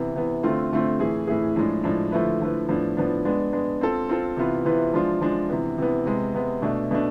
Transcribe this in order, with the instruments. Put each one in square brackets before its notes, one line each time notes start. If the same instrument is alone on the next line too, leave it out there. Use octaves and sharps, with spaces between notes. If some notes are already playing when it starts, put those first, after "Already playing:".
Already playing: [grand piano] C3 E3 B3
C3 E3 B3
D3 A3 C4 F4
D3 A3 C4 F4
A2 E3 A3 E4 G#4
A2 E3 A3 E4 G#4
A2 F3 G#3 D4
A2 F3 G#3 D4
D3 F3 A3 E4 B4
D3 F3 A3 E4 B4
A2 F3 B3 D4
A2 F3 B3 D4
G#3 B3 D4
G#3 B3 D4
C4 F4 A4
C4 F4 A4
C3 E3 B3 F4 B4
C3 E3 B3 F4 B4
F3 G#3 D4 F4
F3 G#3 D4 F4
C3 E3 B3
C3 E3 B3
C3 G#3 B3
C3 G#3 B3
B2 A3 D4
B2 A3 D4